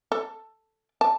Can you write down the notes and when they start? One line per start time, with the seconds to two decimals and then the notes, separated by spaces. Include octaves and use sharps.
0.12 A4
1.01 A5